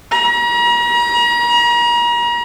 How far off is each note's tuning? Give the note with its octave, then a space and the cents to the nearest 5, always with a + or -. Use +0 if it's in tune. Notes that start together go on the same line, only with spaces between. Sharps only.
A#5 +40